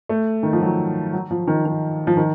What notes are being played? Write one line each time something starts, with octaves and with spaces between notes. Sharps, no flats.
A3
D#3
F3
F#3
F#3
F3
D#3
D#3
F3
D#3